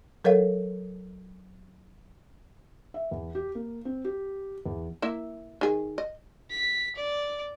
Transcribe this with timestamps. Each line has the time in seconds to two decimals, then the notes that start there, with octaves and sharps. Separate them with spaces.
0.24 F#3 A4 A#4 C#5 F5 F#5
2.94 E5
3.11 E2
3.35 G4
3.55 A#3
3.85 C4
4.05 G4
4.66 E2
5.02 A#3 E4 E5
5.61 D#3 G#4
5.98 D#5
6.51 B6
6.96 D5